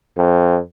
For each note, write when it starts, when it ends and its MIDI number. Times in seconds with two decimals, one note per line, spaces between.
0.17 0.59 41